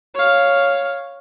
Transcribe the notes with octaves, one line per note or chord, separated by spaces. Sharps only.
C#5 F5